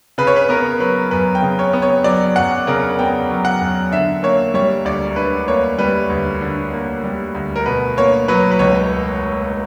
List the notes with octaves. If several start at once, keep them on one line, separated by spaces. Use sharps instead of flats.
C#3 B4
C#5
B4
B3 A#4
F#3 B4
F#2 B4
G5
C#3
C#5
B3
C#5
F#3 D5
F#2 F#5
C#3 A#4
B3 G5
F#3
F#5
F#2
D3 E5
A#3 C#5
G3 C#5
D2 D5
D3 B4
A#3 C#5
G3 B4
D2
D3
A#3
G3
D2
A#4
B2 B4
A#3 C#5
F#3 B4
B4
C#2 C#5